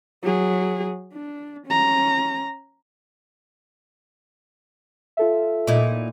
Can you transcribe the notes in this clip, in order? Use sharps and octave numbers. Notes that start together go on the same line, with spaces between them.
F#3 G#4
D4
C#4 A#5
F4 A4 E5
A#2 D#4 E4